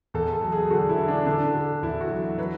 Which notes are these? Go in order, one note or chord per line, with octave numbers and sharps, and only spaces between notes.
E2 A4
A4
F#3
G#4
D3 F#4
E4
D3
D4
D3 D4
D3
E2 E4
F#4
F#3
F#3 B4